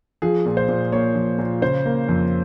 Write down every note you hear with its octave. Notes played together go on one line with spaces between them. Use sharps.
F3 G#4
A#2
C5
A#2
A#3 C#5
F3
A#2
C#3 C5
A#3
F2